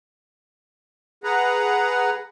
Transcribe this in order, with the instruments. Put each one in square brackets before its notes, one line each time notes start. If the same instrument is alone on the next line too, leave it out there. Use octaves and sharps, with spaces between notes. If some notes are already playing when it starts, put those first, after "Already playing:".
[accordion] G#4 B4 F#5 A#5